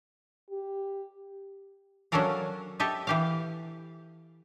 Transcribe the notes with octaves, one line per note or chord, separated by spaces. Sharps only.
G4
F#3 C#4 D4 A4 A#4 F5
G4 A4 D#5 E5
E3 G4 F5